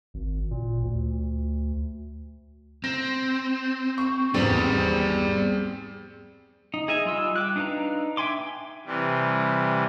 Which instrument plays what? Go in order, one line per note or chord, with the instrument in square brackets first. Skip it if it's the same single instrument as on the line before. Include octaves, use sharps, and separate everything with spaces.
[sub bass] G#1
A#2
D2
[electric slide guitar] C4 [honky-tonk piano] A#6
[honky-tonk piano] C#6
[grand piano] G#1 E2 G#2 [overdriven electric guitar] G3 [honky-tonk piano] C4 [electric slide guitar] G#4 D5
[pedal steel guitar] D#4
G#4 D#5 E5 G#5
G3 F4 D#5 E6
G5 D6 F#6
D4 D#4 B4 F5 A#5
E5 G5 G#5 C6 D6
[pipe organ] C3 E3 G3